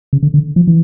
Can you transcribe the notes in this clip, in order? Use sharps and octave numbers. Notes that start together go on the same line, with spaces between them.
C#3
D3
D3
F3
E3